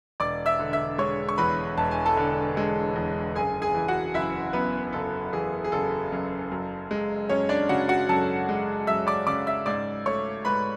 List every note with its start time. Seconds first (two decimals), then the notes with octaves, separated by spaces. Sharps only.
0.20 E1 D5 D6
0.46 E5 E6
0.59 D3
0.73 E5 E6
0.98 G#3 C#5 C#6
1.29 C#6
1.38 E2 B4 B5
1.77 E1 A5
1.91 G#5
2.06 A4 A5
2.17 D3
2.57 G#3
2.96 E2
3.35 F#1 G#4 G#5
3.62 G#4 G#5
3.74 E3
3.88 F#4 F#5
4.14 F#1 E4 E5
4.53 F#2 B3 B4
4.93 F#1 A4
5.33 E3 G#4
5.64 G#4
5.72 F#1 A4
6.12 F#2
6.52 F#2
6.91 G#3
7.29 F#2 C#4 C#5
7.49 D4 D5
7.69 C#3 F#4 F#5
7.89 F#4 F#5
8.09 F#2 A4 A5
8.49 G#3
8.87 F#2 E5 E6
9.07 D5 D6
9.27 C#3 D5 D6
9.47 E5 E6
9.66 G#2 D5 D6
10.06 A3 C#5 C#6
10.45 G#2 B4 B5